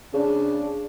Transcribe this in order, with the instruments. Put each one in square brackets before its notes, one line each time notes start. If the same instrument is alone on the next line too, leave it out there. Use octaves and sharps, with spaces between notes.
[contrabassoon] C#3 [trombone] D4